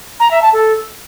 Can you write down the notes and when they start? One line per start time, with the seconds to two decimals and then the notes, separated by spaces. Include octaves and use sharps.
0.20 A#5
0.31 E5
0.42 A5
0.53 A4